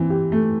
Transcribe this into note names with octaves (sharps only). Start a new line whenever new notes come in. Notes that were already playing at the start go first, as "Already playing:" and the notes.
Already playing: E3 C4
G4
A3